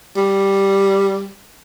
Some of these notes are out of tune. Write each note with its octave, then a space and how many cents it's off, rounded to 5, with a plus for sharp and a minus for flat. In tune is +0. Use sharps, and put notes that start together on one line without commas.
G3 +0